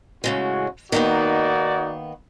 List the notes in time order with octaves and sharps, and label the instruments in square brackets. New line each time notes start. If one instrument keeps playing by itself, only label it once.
[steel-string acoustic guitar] A2 C#3 G#3 [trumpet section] C#4 F#4
[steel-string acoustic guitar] D#3 A#3 B3 [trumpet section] D#4 F#4 D5